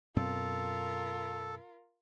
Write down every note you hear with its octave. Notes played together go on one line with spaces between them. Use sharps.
F#2 B2 C4 F4 A4 A#4